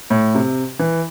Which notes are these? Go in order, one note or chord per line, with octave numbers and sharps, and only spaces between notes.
A2
C3
E3